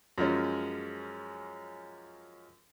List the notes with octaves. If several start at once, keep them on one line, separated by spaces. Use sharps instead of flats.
F#2 F3 G#3 C#4